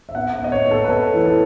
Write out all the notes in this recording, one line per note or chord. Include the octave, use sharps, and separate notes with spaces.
E5
B3 F#5
E5
B3 D#5
C#5
B3
A4
B4
B3 A4
E3
A4